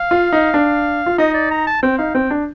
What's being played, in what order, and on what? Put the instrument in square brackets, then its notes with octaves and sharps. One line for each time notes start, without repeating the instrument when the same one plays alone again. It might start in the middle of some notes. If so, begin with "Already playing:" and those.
Already playing: [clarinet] F5
[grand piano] F4
D#4
D4
F4
[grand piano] D#4 [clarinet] D#5
[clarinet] D5
A#5
A5
[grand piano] C4 [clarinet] G5
[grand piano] D#4 [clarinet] F5
[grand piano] C4 [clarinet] G5
[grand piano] D4